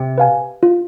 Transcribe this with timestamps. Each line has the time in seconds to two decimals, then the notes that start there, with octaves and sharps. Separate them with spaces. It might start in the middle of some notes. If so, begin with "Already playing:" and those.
Already playing: C3
0.18 B4 F5 G#5
0.63 F4